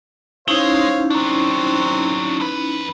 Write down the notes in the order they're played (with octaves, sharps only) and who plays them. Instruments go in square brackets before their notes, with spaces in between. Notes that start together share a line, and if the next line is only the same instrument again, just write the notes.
[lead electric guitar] G#3 [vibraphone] C#4 D#4 E4 [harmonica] C5 C#5 F5
[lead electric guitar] F#3 D4 [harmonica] C4 C#6
[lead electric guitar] F2 B4